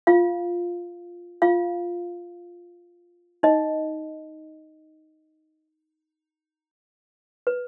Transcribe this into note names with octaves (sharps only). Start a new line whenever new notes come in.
F4 F5
F4 F5
D#4 D#5
B4